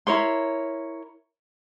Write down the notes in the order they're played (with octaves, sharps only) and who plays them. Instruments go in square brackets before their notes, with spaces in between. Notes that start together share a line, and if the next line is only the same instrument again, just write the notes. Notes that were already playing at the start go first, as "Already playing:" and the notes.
[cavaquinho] E4 A#4 C#5 C6